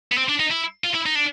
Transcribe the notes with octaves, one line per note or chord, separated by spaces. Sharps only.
B3
C4
D4
D#4
E4
F4
E4
D#4
D4